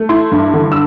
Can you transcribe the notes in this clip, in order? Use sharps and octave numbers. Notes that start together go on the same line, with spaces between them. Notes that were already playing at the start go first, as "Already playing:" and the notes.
Already playing: A3
E4 C6
G2
D3
E6